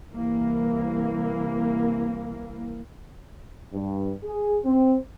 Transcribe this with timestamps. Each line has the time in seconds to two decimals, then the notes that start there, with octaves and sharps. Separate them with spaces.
0.13 C2 E3 A#3
3.73 G2
4.24 G#4
4.65 C4